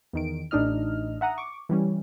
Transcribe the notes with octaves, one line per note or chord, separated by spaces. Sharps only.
E2 D#3 D7
A1 D4 D#4 D#5 F6
E5 F#5 A#5 D#6
C#6 D6
E3 G3 C#4